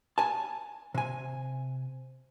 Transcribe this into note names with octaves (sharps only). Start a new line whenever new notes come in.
G#5 A5
C3 G#5